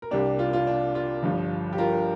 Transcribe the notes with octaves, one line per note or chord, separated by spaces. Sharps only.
A#4
C2 C3 G3 A#3 D4 G4
F4
F4
D4
F4
G1 G2 F3
G4
F4 A#4